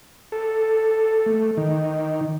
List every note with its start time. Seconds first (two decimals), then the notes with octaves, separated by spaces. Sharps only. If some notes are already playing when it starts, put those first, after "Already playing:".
0.32 A4
1.26 A3
1.57 D#3